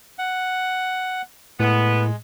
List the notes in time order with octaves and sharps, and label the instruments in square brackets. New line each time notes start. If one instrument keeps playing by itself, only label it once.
[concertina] F#5
[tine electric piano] A2 [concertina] G#3 [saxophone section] B3